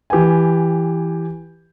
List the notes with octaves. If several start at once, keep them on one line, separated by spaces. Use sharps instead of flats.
E3 G4 B4 G5 G#5